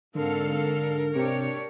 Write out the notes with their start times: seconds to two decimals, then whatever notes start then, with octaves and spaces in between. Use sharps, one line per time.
0.15 G#2 D3 C4 A4 A#4 F5
0.54 A#4
1.15 C3 D4 G4 C#5